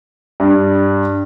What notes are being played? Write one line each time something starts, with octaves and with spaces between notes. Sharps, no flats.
G2